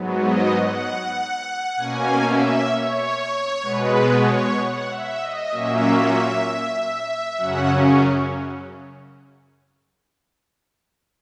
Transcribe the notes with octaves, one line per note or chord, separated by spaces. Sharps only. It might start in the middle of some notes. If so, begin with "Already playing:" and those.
Already playing: G#2 F#3 B3
D#5
F#5
B2 A#3 C#4 G#5
E5
C#5
B2 G#3 B3 B4
C#5
F#5
E5
D#5
A#2 F#3 A#3 C#4 E5
F#2 C#3 F#3 C#4 F#5